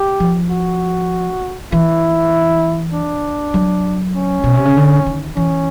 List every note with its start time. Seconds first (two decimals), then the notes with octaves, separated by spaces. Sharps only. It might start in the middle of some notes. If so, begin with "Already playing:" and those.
Already playing: G4
0.20 F3
0.50 F#4
1.72 E3 E4
2.93 D4
3.54 F#3
4.16 C#4
4.44 B2
4.55 C3
4.65 C#3
4.76 D3
5.06 D#3
5.37 E3 C#4